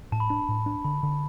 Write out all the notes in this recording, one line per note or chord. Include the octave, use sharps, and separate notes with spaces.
A2 A5
B5
D4 A5
A2
D4
D3 B5
D3